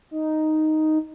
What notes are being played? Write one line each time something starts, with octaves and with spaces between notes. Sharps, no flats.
D#4